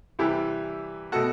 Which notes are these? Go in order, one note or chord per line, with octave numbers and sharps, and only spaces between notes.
C3 E3 G3 E4 G4
B2 A3 F#4 A4